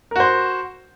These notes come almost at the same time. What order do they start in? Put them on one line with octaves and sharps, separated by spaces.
A#4 F#4 C5